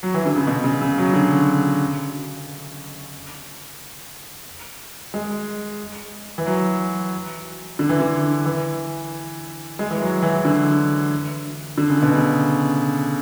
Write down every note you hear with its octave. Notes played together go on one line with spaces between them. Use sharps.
F#3
E3
D3
C#3
B2
C#3
C#3
F#3
D3
G#3
E3
F#3
D3
E3
D3
E3
G#3
E3
F#3
E3
E3
D3
D3
C#3
B2
C#3